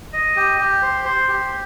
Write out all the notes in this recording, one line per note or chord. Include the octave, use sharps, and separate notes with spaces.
D#5
G4
G4
C5
C5
G4